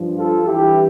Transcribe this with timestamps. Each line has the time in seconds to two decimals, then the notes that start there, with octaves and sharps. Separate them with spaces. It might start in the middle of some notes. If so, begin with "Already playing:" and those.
Already playing: G2 F3
0.17 F4 A4
0.47 G2 E3 E4 G4